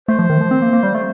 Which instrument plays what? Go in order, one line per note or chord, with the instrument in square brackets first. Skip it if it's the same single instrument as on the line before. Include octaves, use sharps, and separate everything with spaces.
[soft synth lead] A3 [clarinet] C5
[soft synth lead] F3
D#3
F3
C4
A#3
A#3
G3
A3